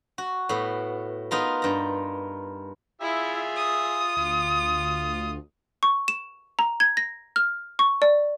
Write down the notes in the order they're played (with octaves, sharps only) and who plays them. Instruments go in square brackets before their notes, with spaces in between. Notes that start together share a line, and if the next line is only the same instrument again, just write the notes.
[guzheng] F#4
A2 B3
B3 D#4 F4 A#4
G2 A#5
[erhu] E4 [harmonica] F4 G#4 E5
[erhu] D#6
[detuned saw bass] D2 [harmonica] F4
[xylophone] C#6
E7
A#5
G#6
A#6
F6
C#6
D5